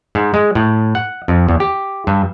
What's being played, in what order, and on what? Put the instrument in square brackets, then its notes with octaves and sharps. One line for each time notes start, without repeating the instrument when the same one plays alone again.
[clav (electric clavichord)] G#2
G#3
A2
F#5
F2
E2
G4
G2